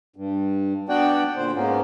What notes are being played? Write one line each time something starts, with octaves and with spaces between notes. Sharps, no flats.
G2
B3 D4 F#4 D5 F#5 G5
A#2 D3 C5
G#2 A#3 B3 C#4